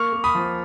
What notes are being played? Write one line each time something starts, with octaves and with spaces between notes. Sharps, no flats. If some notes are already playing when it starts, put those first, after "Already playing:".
Already playing: A#3 C#6 F6
A#3
B5 D#6
F3